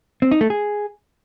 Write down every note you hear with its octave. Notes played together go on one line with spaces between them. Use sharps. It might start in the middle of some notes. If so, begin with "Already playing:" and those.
C4
D#4
A3
G#4